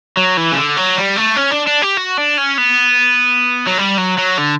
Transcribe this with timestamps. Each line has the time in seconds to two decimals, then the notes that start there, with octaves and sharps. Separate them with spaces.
0.17 F#3
0.37 E3
0.52 C#3
0.57 D3
0.77 F#3
0.97 G3
1.17 A3
1.37 C#4
1.52 D4
1.67 D4
1.82 G4
1.97 F#4
2.17 D4
2.37 C#4
2.58 B3
3.67 F#3
3.78 G3
3.98 F#3
4.18 F#3
4.38 D3